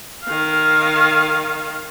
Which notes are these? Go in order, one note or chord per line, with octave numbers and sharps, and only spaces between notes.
D#3 F5